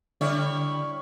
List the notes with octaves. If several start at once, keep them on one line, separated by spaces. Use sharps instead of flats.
D3 G3 E4 C#5